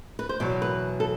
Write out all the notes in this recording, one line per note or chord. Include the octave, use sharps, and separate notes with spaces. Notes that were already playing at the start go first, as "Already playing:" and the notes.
B4
C5
E2 B2 F#3 D5
B4
A4